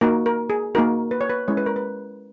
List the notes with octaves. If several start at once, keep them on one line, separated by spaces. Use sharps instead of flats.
A#3 D#4 F#4 A#4
A#4
G#4
A#3 D#4 F#4 A#4
B4
C#5
B4
G#3 C#4 E4 C#5
B4
A#4
B4